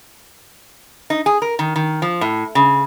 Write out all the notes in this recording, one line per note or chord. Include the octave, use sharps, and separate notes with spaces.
D#4
G#4
A#4
D#3
D#3
F3
A2
C#3